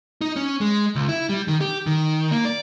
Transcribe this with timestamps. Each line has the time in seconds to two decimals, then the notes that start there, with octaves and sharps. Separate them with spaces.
0.21 D#4
0.36 C#4
0.61 G#3
0.95 C#2
1.08 E4
1.29 G3
1.48 D#3
1.61 G4
1.87 D#3
2.31 A#3
2.45 D5